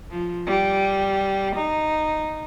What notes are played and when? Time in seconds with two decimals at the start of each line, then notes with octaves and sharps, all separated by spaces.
0.10 F3
0.46 G3
1.56 D#4